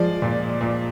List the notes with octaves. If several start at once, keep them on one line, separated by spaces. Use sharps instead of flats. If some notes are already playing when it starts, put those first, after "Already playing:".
Already playing: F3 G#3 D5
A#2
A#2